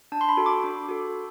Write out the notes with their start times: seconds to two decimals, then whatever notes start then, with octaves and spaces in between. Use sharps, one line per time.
0.12 D4 A5
0.21 C6
0.29 B5
0.37 F#4 A4
0.46 D6
0.64 D4
0.89 F#4 A4